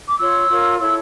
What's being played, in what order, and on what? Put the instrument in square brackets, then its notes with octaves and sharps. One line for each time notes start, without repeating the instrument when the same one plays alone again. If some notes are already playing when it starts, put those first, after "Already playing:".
[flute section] D6
F4 C#5 E6
F4 A#4 C#5
E4 A4 C#5 E6